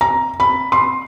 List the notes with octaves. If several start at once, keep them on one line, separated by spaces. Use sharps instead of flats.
A#5
B5
C6